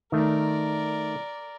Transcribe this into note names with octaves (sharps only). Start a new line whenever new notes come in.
D#3 A3 A#4 D5